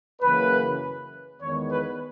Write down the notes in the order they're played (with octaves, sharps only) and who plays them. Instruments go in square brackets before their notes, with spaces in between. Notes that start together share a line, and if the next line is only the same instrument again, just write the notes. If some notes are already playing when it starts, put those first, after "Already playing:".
[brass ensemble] F#2 C#3 E3 A#3 B4
E2 D#3 G#3 B3 C#5
B4